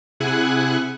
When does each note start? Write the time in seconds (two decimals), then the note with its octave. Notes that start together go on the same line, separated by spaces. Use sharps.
0.20 C3 E4 G#4 F#5 G#5 F#6